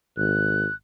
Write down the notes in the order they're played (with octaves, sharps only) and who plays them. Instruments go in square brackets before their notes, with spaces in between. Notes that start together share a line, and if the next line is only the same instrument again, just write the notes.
[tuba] G#1 [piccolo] F#6